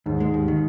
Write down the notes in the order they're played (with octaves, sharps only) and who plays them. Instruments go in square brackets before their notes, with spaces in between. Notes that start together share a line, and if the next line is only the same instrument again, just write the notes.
[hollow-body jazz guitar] D#2 [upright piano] G#2
[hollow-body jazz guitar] G#3
D#2
D#3